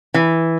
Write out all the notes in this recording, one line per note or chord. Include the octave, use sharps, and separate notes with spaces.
E3